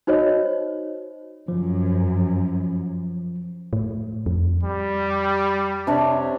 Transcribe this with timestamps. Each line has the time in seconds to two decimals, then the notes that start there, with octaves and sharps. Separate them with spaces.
0.07 D#4 F#4 C5 C#5 D#5
1.48 F#2 F3
3.73 A2
4.26 F2
4.63 G3
5.87 C3 D4 C#5